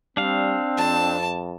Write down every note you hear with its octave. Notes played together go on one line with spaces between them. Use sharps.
G3 C4 D4 F5
F2 A5